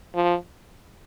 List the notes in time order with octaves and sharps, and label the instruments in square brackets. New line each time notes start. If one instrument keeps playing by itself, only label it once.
[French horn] F3